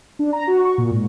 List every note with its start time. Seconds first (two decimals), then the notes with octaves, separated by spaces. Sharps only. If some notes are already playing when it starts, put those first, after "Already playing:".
0.19 D4
0.33 A#5
0.47 F#4
0.64 C#6
0.78 A#2
0.91 G#2